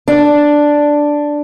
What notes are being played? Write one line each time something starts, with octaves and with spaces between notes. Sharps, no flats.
D4